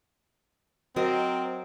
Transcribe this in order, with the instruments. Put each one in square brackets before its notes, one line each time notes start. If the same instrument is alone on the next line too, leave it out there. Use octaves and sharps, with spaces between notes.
[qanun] F#3 A#4 D#5 [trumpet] C4